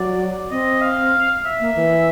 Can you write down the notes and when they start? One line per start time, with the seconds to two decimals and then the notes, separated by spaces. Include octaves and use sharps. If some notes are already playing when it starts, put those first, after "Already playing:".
Already playing: F#3 D5
0.51 C4 D#5
0.81 F5
1.45 E5
1.60 A#3
1.76 E3